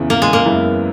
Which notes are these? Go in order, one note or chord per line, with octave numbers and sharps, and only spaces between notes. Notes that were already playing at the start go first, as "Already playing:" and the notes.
Already playing: E2 C#3 E3
A#3
G#3
A#3
F#2 E3 G#3 B3 E4